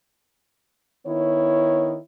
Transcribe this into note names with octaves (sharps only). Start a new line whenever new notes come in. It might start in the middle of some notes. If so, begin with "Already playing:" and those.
D#3 B3 E4 C#5